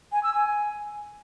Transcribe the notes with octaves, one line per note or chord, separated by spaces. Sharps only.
G#5
E6
G#5